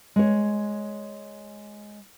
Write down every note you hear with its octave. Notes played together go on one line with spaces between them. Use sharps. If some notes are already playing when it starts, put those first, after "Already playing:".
G#3 C#5